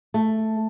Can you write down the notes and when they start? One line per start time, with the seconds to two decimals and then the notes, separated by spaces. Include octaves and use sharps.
0.14 A3